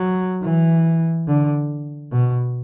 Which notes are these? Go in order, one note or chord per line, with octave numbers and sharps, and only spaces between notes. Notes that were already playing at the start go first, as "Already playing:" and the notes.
Already playing: F#3
E3
D3
B2